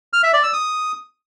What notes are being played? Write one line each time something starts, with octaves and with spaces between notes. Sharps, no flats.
F6
E5
D5
E6
D#6